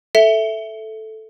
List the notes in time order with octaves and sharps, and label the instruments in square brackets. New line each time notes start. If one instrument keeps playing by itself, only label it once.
[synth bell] A4 [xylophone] E5